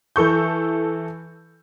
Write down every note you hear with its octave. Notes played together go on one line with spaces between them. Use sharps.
E3 A4 C#6 G6